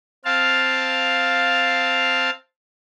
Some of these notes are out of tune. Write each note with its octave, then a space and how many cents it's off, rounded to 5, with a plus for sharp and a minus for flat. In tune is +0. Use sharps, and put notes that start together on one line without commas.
C4 +0 F5 +0 A5 +0